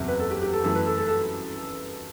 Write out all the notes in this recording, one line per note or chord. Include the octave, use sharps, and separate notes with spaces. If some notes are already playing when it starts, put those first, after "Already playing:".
Already playing: F#1 E2 C3 F#3 E5
B4
A4
G4
G4
A4
F#2 E3 A3 A4
B4
A4
A4
A4